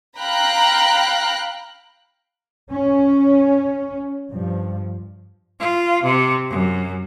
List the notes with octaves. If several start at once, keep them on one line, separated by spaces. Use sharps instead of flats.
F5 G5 A#5 B5 F#6
C#4
G2 F3
F4
C3
F#2